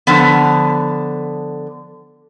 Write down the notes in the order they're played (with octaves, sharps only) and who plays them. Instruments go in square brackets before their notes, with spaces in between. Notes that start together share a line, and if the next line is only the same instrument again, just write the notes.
[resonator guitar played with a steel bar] D3 F3 B3